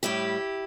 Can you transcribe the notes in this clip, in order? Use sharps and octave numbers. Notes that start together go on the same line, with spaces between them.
A2 G3 E4 G4